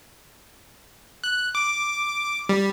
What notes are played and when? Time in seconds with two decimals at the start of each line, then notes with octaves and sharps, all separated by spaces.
1.24 F#6
1.55 D6
2.49 G3